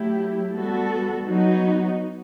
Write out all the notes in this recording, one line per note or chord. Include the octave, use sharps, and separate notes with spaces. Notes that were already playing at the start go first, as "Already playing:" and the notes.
Already playing: F#3 A3 E4 G4
G3 B3 F#4 A4
F#3 B3 D#4 F#4